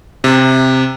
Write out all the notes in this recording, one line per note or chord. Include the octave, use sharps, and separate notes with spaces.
C3